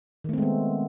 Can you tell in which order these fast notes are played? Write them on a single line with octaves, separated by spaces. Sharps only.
D#3 A3 C4 G#3 B3